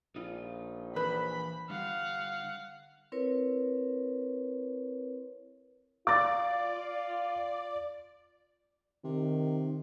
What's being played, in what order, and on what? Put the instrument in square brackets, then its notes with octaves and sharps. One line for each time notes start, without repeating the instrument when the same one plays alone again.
[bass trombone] A#1 [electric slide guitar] D#4 F4
[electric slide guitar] E3 C5 [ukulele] B4 [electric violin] B5
[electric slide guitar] D3 G3 [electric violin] F5 F#5
[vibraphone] C4 E4 A#4 B4 C#5
[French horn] F4 [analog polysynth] D5 [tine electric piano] F5 [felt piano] D6 A6
[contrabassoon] C3 [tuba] D#3